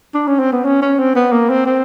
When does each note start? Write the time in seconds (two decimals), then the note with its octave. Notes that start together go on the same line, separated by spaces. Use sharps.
0.14 D4
0.27 C#4
0.39 C4
0.53 B3
0.65 C#4
0.82 C#4
0.99 C4
1.16 B3
1.32 A#3
1.50 C4
1.66 C4